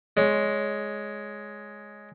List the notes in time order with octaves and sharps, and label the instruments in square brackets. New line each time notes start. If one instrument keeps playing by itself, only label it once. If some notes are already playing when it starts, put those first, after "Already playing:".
[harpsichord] G#3 C#5